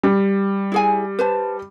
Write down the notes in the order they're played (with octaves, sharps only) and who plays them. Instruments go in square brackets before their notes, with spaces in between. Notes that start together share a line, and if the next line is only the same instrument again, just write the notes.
[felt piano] G3
[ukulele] E4 G#4 G#5
B4 C5 A5